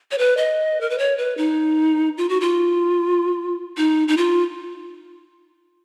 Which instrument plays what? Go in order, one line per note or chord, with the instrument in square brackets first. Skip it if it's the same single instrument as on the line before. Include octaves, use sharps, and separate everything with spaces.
[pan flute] C#5
B4
D#5
A#4
B4
C#5
B4
D#4
F4
F#4
F4
D#4
D#4
F4